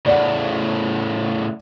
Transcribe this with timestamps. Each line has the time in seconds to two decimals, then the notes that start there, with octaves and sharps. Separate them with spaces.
0.06 A2 C#3 D5 F#5